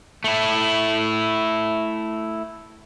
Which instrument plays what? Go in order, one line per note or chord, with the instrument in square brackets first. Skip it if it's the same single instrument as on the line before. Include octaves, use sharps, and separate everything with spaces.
[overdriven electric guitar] A3 E4